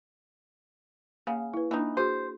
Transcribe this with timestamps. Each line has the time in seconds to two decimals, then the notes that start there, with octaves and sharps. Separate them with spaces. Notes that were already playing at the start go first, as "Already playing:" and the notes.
1.27 C#3 A#3 F5
1.54 E4 B4
1.71 E3 A#3 D4 D#4
1.97 F#4 G#4 C5